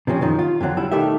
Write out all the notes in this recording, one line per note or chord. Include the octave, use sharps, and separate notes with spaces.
C3 F3 C4 C#4
F#2 D#3 F3
F4
F2 D3 F#3 C4
G3 E4
B1 D#3 A3 G4 E5